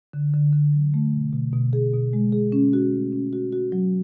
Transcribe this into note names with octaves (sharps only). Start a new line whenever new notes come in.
D3
D3
D3
F#3
A3
B2
B2
B2
G#4
B2
G#3
G#4
C#4
F#4
A3
C#4
F#4
F#4
F#3